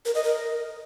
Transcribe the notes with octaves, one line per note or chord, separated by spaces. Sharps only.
A#4
D#5
A#4